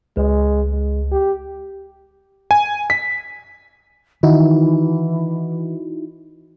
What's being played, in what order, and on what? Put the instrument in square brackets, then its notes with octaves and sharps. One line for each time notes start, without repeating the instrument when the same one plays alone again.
[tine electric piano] C#2 [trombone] G#3
[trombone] G#3
G4
[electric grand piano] G#5
B6
[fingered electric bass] D#3 [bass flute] E3 [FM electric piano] D#4 E4 F#4